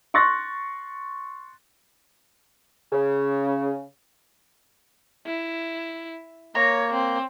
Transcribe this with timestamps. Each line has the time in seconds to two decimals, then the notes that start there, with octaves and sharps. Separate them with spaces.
0.14 C6 C#6 F#6 A6 A#6
2.93 C#3
5.26 E4
6.55 A#3 C#5 A#5
6.93 C4